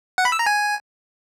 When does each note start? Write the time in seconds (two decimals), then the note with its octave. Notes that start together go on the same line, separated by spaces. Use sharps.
0.18 F#5
0.25 B5
0.32 E6
0.39 A#5
0.46 G#5